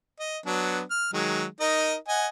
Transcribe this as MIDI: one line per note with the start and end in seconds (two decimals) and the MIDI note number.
0.19 0.38 75
0.46 0.81 54
0.46 0.81 59
0.46 0.81 62
0.91 1.09 89
1.13 1.45 51
1.13 1.45 54
1.13 1.45 56
1.60 1.95 63
1.60 1.95 70
1.60 1.95 75
2.08 2.27 75
2.08 2.27 78
2.08 2.27 80